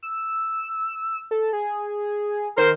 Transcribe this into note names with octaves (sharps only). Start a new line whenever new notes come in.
E6
A4
G#4
D#3 A#4 C5